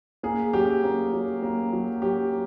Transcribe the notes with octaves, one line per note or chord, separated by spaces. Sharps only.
A#3 G#4
F#3 G4
A#3
F#3
A#3
F#3
F#3 G4